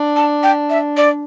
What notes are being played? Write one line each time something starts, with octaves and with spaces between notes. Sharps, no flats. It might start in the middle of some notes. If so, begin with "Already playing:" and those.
Already playing: D4
A5
G5
E5
D5